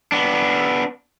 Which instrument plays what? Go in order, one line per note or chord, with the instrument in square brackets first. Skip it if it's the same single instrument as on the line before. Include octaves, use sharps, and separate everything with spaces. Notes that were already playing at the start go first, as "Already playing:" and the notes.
[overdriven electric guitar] B3 D4